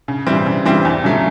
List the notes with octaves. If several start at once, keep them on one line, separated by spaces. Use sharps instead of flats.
C#3
E3 G3 C4
C#3
E3 G3 C4
E2
C#3 F#3 A3